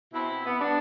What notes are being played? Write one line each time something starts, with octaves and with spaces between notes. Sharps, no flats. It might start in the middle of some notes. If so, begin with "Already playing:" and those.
B2 C4 E4
B2
B3
G3 B3 D4